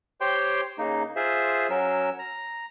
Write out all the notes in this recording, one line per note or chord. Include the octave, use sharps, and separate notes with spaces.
G4 C5 C#5 G5 C6
C#3 A#3 D#4
F4 G#4 C5 E5
F#3 C#4 A#4 E6
A#5